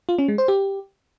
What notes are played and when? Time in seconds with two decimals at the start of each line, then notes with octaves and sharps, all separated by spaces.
0.09 F4
0.19 C#4
0.28 G#3
0.38 C5
0.48 G4